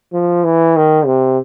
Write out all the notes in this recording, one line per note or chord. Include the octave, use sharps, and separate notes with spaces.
F3
E3
D#3
C3